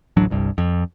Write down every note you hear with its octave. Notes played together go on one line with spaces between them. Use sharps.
D1 A1 F#3 D4
G1 C2 G2
F2